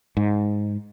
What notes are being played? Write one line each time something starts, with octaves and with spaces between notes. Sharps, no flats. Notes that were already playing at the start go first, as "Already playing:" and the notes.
G#2